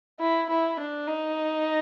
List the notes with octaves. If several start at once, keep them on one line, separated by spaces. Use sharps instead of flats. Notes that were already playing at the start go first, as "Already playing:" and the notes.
E4
E4
D4
D#4